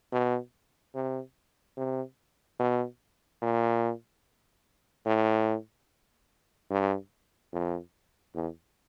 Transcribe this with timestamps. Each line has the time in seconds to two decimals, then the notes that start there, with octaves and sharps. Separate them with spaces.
0.12 B2
0.94 C3
1.77 C3
2.59 B2
3.42 A#2
5.06 A2
6.70 G2
7.53 F2
8.35 E2